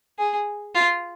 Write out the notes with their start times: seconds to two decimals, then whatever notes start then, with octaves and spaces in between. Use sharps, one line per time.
0.18 G#4
0.75 F4